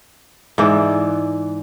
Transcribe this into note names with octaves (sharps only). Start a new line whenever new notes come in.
G#2 E3 D5